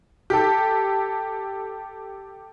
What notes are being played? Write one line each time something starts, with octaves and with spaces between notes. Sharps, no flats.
G4 A4